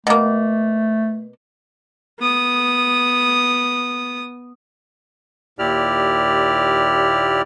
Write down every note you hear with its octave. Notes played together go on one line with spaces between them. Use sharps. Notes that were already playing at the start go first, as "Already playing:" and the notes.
B2 A3 A#3
B3 D#6
D#2 A#2 E4 G4 D5 F6